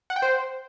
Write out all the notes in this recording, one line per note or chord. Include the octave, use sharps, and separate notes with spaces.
F#5
G5
C5